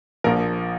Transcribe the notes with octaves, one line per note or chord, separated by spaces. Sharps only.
A#1 A#2 F3 A#4